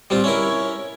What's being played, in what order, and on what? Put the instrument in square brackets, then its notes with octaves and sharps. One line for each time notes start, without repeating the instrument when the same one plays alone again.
[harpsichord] G3 C4 F4
[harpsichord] C#4 E4 A#4 [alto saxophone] C#5